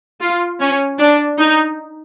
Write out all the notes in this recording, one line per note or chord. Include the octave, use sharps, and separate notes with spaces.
F4
C#4
D4
D#4